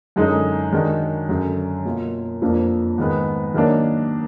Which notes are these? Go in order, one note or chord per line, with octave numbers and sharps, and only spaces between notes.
F#2 D3 G#3 D#4
D#3 G#3 D4 F#4
F#2 D3 F#3
B2 A#3 F4
F2 F3 A#3 D4
G#2 D#3 G#3 B3
D#3 F#3 A#3 D4